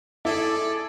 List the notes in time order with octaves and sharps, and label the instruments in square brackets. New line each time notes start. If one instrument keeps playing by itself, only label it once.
[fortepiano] E4 [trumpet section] G#4 A4 D5